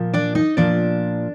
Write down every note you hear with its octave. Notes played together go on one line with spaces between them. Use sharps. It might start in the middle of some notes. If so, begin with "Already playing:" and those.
Already playing: A#2 F3
D4 D5
D#4 D#5
A#2 F3 D4 D5